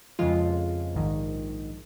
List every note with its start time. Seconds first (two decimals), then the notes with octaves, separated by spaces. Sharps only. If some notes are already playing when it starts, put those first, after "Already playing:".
0.19 F2 C#3 F3 G#3 F4
0.95 A#1 G#2 D#3